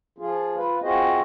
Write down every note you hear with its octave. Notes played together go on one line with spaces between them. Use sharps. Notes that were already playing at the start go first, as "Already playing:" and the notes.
F3 F4 G#4
F4 B4
C4 F4 F#4 G#4 C5 D#5